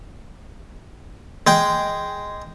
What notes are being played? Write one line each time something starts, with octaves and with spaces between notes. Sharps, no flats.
G#3 G5